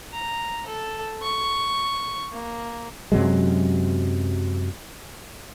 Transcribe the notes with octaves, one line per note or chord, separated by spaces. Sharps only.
A#5
A4
C#6
A#3
F#2 C3 F#3 G#3